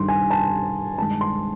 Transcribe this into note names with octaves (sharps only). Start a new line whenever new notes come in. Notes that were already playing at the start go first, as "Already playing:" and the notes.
Already playing: G2 D#3 G3 C6
G#5
A5
G2 D#3 G#3 A5
C6